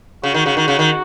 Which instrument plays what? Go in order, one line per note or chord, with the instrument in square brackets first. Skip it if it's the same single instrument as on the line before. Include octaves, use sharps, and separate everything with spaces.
[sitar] C#3 [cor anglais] F#4
[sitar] D#3
C#3
D#3
C#3
D#3